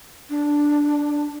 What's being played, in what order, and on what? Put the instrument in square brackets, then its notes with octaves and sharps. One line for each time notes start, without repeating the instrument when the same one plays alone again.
[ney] D4